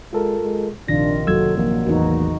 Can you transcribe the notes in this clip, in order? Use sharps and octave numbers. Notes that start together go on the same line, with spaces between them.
G#3 F4 A4 A#4
G#3
A#1 C3 D#3 D4 F4 A#6
F#1 F#3 F#4 A4 E6 G#6
A#1 A#3
A1 E2 D#4 F#4